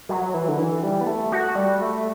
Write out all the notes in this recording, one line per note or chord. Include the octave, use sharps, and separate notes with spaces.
F#3
E3
D3
E3
G3
B3
A3
F#4
G3
A3